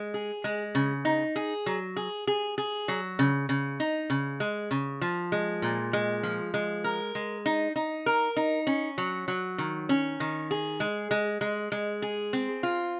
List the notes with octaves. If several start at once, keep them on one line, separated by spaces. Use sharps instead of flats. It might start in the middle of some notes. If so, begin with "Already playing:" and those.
Already playing: G#3
G#4
G#3
C#3
D#4
G#4
F#3
G#4
G#4
G#4
F#3
C#3
C#3
D#4
C#3
G#3
C#3
F3
G#3
A#2
G#3
F3
G#3
A#4
G#3
D#4
D#4
A#4
D#4
C#4
F#3
F#3
D#3
C#4
D#3
G#4
G#3
G#3
G#3
G#3
G#4
C4
F4